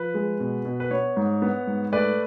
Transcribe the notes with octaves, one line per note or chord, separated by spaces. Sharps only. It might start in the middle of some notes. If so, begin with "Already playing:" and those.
Already playing: F3 B4
G#3
B2
B2
B4
B3 C#5
G#2
B3
G#2
A3 B4 D5